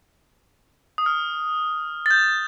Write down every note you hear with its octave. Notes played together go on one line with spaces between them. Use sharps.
D#6
F6
A6
G6